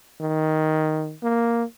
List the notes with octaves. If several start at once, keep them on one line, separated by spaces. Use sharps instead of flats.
D#3
A#3